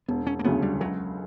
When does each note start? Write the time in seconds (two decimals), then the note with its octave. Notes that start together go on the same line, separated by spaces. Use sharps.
0.08 E1 B3
0.27 C#4
0.39 A#3
0.44 D2 C#3 F#3 B3
0.62 G3
0.80 C#2 F#3